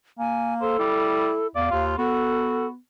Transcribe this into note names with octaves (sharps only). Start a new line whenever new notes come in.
A#3 G#5
A4 C5
G3 E4
E2 D5 F5
D#2 F4
B3 F#4 A4